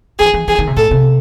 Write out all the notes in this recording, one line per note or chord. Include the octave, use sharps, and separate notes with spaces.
E3 G#4
E3
E3 G#4
D#3
C3
A2 A4
C3